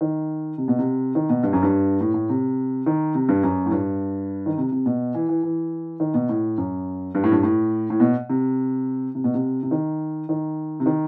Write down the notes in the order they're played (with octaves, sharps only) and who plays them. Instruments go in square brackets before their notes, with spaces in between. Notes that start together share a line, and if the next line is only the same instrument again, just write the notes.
[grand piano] D#3
C3
B2
C3
D#3
B2
G2
F#2
G2
A2
A2
C3
D#3
C3
G2
F#2
A2
G2
D#3
C3
C3
B2
E3
E3
E3
D#3
B2
A2
F#2
G2
A2
G2
A2
A2
B2
C3
C3
B2
C3
C3
D#3
D#3
C3
D#3